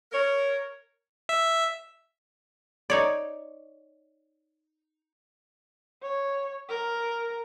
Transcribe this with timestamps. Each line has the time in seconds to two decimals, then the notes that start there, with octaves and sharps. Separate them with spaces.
0.12 A#4 C#5
1.29 E5
2.90 D#4 C#5 D5
6.02 C#5
6.69 A#4